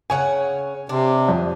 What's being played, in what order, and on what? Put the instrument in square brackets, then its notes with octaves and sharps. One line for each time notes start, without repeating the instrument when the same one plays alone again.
[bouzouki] C#3 C#5 F#5 [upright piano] G#5
[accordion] C3 [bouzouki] D4
[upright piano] F2